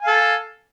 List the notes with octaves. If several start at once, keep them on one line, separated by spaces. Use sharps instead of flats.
A4 F5 G#5